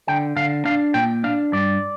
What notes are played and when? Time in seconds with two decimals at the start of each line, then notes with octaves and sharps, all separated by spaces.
0.08 D3 G5
0.36 D3 F5
0.65 D4 F5
0.94 A#2 G5
1.24 D4 F5
1.53 G2 D5